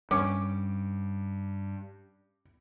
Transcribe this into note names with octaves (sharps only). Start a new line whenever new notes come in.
G2 C#4 D6